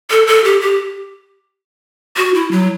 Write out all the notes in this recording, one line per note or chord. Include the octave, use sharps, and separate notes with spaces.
A4
A4
G4
G4
F#4
E4
F#3